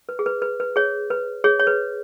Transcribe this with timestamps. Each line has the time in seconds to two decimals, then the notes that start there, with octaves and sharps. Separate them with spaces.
0.09 B4
0.19 G#4
0.26 B4
0.42 B4
0.60 B4
0.76 G#4 C#5
1.10 B4
1.44 G#4 C#5
1.60 C#5
1.67 B4